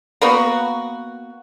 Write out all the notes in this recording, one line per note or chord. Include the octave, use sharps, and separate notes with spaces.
A#3 B3 F#4